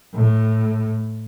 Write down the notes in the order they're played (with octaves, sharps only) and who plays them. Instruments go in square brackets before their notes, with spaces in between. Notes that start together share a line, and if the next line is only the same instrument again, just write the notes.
[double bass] A2